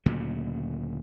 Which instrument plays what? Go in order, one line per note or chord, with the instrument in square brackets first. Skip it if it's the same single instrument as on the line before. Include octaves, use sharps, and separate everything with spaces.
[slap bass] D2 A#2 C#3 F#3